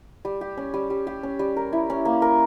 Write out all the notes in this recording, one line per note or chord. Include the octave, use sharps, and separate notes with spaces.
G3
G4
C#4
G3
G3
G4
C#4
G3
A#4
E4
C#4
A#3
A#4